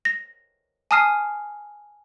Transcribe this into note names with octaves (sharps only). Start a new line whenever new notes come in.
A#6
G#5 A5 D#6 F6 C7 D#7